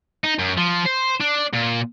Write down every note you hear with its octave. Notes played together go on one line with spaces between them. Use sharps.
D#4
F#2
F3
C5
D4
A#2